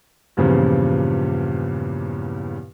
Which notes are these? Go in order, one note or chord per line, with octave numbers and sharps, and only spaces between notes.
E2 G2 A#2 C#3 F3